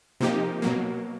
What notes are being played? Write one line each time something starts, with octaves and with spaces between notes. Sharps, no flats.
C3 F3 A#3 D#4 G4
B2 F#3 A#3